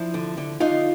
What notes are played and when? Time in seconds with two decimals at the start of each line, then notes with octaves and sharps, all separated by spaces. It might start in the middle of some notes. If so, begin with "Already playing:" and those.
Already playing: F3 D4 E4
0.14 D3
0.37 D3
0.60 D3 D#4 F4